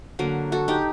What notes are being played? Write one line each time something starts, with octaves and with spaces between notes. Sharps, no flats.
D3 F#3 A#3
F#4 A4
D#4 G4